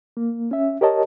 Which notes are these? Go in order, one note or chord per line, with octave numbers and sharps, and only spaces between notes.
A#3
C#4 E5
G4 A#4 C#5 D#5 A5